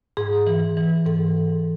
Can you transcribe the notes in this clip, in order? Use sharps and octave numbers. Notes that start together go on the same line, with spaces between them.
G#2 G#4
E3
E3
G#2 A4